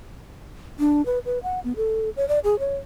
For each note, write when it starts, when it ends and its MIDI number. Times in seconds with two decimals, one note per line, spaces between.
0.79 1.05 62
1.06 1.19 71
1.26 1.39 71
1.43 1.60 78
1.64 1.73 59
1.76 2.10 69
2.17 2.28 73
2.28 2.39 74
2.44 2.58 68
2.59 2.76 73